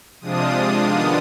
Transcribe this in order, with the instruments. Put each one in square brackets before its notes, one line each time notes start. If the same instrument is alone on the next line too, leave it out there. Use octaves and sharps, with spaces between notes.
[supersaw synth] C3 F3 G#3 D4 F4 D#6
D#3 B3 D4 F4